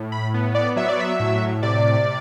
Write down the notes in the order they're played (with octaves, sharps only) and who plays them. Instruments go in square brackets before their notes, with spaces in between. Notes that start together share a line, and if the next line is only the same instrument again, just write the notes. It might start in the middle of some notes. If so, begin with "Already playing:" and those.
Already playing: [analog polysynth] A2
B5
B3
D5
F#3 E5
D5
E5
A2
C3 D5